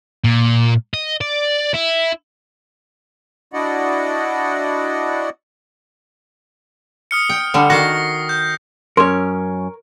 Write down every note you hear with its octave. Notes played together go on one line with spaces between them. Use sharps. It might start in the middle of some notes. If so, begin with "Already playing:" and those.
A#2
D#5
D5
E4
D4 E4 F#4 D5 D#5 F#5
D#6 F6 C#7
G5
D3 G3
D#3 F#4 A#6 C7
G6
F#2 C#4 A#4 C#5 C6